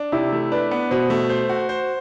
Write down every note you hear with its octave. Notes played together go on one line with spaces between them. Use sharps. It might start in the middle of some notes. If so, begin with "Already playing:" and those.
Already playing: D4
C3 E4
A3
D4 B4
B3
B2 C5
A3
C5
F#4
C5